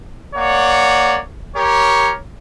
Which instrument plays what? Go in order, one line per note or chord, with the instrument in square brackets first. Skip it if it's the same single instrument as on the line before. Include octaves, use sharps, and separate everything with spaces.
[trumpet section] A#3 C#5 D5 F#5
G4 A#4 C#5